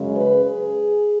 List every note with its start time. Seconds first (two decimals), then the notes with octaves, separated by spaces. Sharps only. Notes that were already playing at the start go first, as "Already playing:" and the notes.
Already playing: F#2 C#3 G#3
0.15 B4
0.44 G#4